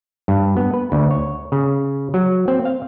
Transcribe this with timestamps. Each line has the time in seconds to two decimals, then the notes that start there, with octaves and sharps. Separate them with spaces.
0.28 G2
0.57 B3
0.74 B4
0.92 D2
1.11 C#5
1.52 C#3
2.14 F#3
2.48 C4
2.65 F5